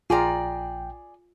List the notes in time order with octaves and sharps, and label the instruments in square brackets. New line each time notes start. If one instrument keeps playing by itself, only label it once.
[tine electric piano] A#1 G5 [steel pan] F4 [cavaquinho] G#4 D5 A#5